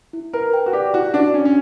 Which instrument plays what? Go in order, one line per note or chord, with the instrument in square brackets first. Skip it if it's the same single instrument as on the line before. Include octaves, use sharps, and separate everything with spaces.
[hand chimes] E4
[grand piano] A#4 [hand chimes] B4
[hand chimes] G5
[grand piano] F#4
[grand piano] G4 [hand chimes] D5
[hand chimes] E4 [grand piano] F#4
[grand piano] D4 [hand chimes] F#4
[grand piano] C#4 [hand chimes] D4
[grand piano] C#4